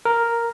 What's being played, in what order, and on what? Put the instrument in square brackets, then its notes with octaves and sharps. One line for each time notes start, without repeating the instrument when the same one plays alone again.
[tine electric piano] A#4